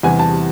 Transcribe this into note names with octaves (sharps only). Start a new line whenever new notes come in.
E2 C3 E3 G3 F#5 G#5
A5